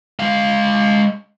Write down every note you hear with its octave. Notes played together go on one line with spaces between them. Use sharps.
G#3 F5